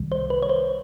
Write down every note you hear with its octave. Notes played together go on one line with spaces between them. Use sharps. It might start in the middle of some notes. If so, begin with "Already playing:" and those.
Already playing: C2 C3 D#3 G3
C5
B4
C#5
C5